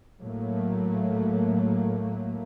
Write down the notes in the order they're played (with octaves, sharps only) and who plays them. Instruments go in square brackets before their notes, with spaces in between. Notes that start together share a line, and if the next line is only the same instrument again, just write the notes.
[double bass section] A2 F#3 A3 A#3